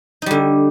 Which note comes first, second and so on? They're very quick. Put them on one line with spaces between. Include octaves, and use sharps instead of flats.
D#4 G3 D3